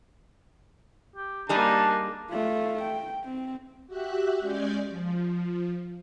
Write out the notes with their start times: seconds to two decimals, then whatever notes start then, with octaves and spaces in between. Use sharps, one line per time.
1.16 G4
1.49 G3 A#3 D4 D#4 G#4 A5
2.31 A3 F4
2.82 G5
3.24 C4
3.87 F#4 G4 E5 F#6
4.40 G#3 C#4 D5 G#5 G6
4.89 F3